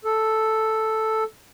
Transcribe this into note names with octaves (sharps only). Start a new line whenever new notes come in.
A4